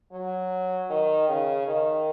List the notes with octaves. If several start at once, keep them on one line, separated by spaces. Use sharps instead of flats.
F#3
D#3
C#3
D#3